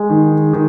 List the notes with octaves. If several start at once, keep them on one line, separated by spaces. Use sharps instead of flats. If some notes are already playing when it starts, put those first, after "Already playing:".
Already playing: G#3
D#3
D#3